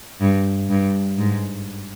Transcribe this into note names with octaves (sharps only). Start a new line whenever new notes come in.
G2
G2
G#2